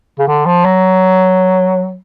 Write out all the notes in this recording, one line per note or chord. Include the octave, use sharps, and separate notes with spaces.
C#3
D3
F3
F#3